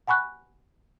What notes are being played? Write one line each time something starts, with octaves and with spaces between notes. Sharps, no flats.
F#5 G#5 B5 C#6 F#6